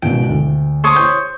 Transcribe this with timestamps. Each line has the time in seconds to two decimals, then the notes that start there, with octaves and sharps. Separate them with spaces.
0.02 G#1 C#2 B2 G5
0.29 D2
0.84 C5 C#5 D#6
0.96 G6